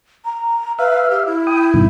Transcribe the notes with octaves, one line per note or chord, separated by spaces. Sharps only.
A#5
B4 E5 F5
G4
E4
G5 D#6
G2 B2 D#3